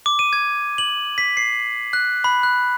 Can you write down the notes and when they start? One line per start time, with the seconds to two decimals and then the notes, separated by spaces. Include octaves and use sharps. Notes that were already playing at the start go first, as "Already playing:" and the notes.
0.06 D6
0.19 D#7
0.33 G#6
0.78 F#7
1.18 B6
1.37 C7
1.93 F#6
2.24 B5
2.43 F#6